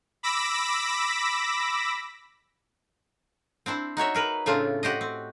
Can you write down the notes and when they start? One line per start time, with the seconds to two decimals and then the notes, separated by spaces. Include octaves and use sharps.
0.23 B5 D6 E6 A#6 B6
3.66 C4 D4 E4 C5
3.97 D#4 F#4 C#5 E5
4.15 G#4 A#4 B4
4.46 A2 C#3 A3 C4 D4 F4
4.83 F#4 G4 C5 D#5
5.01 C4